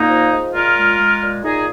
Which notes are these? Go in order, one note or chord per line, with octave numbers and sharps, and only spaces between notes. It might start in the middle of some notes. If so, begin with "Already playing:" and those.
Already playing: A#2 A#3 D#4
F3
G#3
A#2 F4 A#4
G#3
G#3
A#2
A#2 D#4 G#4